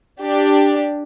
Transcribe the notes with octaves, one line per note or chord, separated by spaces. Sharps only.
D4 G4